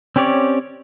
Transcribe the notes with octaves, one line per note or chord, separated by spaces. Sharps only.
C4 C#4 G4 C#5 D5